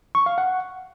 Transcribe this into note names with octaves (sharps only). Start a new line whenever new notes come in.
C#6
F5
F#5